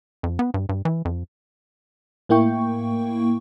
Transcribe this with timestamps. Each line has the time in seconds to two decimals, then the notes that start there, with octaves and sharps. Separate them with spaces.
0.23 F2
0.39 B3
0.54 G2
0.69 G2
0.85 E3
1.05 F2
2.29 A2 A#3 E4 G5 C#6